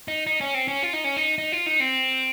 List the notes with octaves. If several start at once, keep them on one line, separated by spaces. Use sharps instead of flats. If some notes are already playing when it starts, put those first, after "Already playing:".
D#4
D#4
C#4
C4
C#4
F4
D#4
C#4
D#4
D#4
F4
D#4
C4